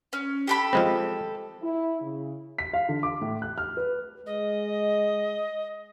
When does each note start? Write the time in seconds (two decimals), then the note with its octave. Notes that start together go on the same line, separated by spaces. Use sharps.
0.13 C#4
0.47 G4 A4 B5
0.73 F3 G#3 C4
1.63 E4
2.01 C#3
2.58 B6
2.73 F5
2.89 D3
3.03 D6
3.22 A2
3.42 F#6
3.58 F6
3.77 B4
4.26 G#3 D#5